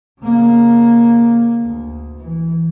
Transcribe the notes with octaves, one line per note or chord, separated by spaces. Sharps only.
C#3 A#3
D2
E3